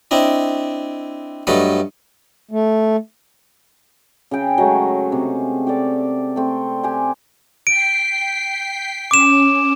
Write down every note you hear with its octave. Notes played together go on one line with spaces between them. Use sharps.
C4 D4 E4 D#5
G2 F#3 A3 A4 B4 D#5
A3
C#3 G#4 G5
F#3 G#3 A3
C3
G4 A4 D5
A3 C4
G4 G#5
G5 B6 C7 D7
C#4 D6 E7